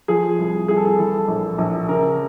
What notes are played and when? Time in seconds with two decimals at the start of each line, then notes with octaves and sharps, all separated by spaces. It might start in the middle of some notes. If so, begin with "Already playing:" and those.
0.08 F3 G#4
0.39 C2
0.68 C2 G#4
0.77 A4
0.85 G#4
0.98 E3 A4
1.28 A#1
1.58 A#1
1.89 C#3 A#4